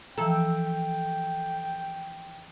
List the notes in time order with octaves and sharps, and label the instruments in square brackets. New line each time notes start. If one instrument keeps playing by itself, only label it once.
[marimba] E3 F3 A#5 [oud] A4 [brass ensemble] G5